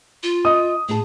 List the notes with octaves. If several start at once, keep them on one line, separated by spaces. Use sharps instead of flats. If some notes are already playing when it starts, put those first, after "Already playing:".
F4
D#5 E5 D#6
A2 G#4 A5